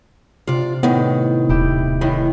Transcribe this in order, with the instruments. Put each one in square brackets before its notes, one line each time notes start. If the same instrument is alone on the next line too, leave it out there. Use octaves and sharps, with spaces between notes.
[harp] C3 [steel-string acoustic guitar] F4 D5
[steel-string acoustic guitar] A2 D#3 [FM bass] B3
[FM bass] D#1 [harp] E4 G4
[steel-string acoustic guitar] A2 D#3 E3